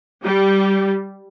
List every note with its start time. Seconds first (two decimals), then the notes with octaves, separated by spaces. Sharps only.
0.25 G3